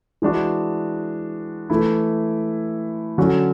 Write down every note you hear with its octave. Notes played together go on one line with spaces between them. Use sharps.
E3 G#3 D4 F#4
E3 A3 E4
D3 F#3 C#4 F#4